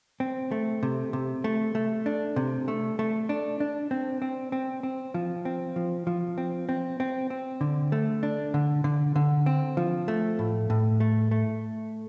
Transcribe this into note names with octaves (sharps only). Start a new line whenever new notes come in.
C4
A3
C3
C3
A3
A3
D4
C3
A3
A3
D4
D4
C4
C4
C4
C4
F3
C4
F3
F3
C4
C4
C4
C4
D3
A3
D4
D3
D3
D3
C4
F3
A3
A2
A2
A3
A3